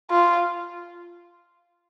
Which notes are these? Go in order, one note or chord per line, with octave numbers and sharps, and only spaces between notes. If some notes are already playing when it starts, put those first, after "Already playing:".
F4